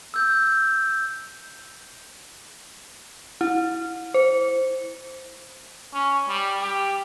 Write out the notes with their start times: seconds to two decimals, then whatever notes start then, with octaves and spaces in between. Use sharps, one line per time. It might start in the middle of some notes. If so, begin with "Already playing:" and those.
0.14 E6 G6
3.41 E4
4.14 C5
5.94 C#4
6.28 G3
6.62 G4